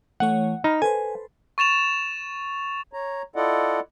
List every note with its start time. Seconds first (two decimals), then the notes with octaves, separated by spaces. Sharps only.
0.20 E3 A3 C#5 F#5
0.64 D#4 B5 F6
0.82 A4 B4 C5 G#5
1.58 C#6 A6 E7 F7
2.93 C#5 A#5
3.36 E4 F4 A4 D5 D#5 F#5